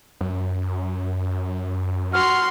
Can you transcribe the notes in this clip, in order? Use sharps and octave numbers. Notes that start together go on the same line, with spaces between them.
F#2
F#4 C6 F6